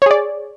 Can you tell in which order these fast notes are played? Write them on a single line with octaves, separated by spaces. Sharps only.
C#5 G#4 D5